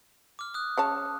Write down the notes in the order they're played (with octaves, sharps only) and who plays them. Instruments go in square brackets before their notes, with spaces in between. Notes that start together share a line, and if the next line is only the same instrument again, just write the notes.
[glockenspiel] D6 F6
D#6 F#6
[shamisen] C#3 C#5 A5